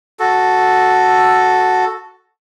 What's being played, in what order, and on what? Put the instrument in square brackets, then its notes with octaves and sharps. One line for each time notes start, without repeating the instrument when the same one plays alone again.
[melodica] F#4 A4